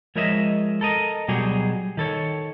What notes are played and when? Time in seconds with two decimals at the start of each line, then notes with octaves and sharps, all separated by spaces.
0.16 F3 G#3 A#4 C#5 D#5 E5
0.81 A4 A#4 D#5
1.28 B2 F#3 G3 G4 G#4
1.97 D#3 A4 C#5